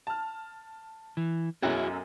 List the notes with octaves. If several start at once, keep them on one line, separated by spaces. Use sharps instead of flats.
A5 F6
E3
B1 F#2 F#3 E4 F#4 G#4